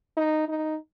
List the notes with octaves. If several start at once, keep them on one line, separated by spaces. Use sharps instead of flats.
D#4
D#4